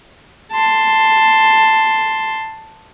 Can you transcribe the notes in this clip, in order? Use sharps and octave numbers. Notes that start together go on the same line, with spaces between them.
A5 C6